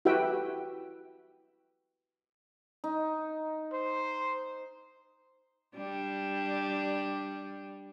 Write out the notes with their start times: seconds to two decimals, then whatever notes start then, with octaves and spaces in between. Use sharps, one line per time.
0.05 E4 F#4 G4 B4 E5 G5
2.84 D#4
3.73 C5
5.76 G3 D4